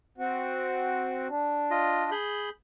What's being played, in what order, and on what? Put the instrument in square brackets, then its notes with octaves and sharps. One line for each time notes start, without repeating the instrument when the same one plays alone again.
[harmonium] C4 F#4
D4
[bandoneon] F4 D#5
G#4 B5 G6